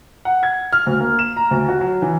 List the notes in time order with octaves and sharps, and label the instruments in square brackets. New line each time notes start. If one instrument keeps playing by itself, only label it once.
[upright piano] F#5
G#6
F6
D2
A#3
E7
A#5
D2
F#4
F#3
E3